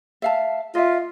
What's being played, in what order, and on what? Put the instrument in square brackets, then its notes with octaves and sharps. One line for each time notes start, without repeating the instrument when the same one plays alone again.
[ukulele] E5 F5 A5
[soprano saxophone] F4 [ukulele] D#5 E5